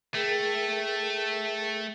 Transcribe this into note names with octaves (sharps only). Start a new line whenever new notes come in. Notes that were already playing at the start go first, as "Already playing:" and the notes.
A3 G#4 A#4 G5